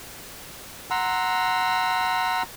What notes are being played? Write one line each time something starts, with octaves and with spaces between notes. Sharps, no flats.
F#5 A#5 C6 E6